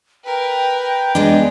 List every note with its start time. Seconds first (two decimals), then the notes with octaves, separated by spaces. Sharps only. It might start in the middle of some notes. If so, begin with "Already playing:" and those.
0.25 A#4 B4 G5
0.81 G5
1.15 G#3 B3 D4 D#5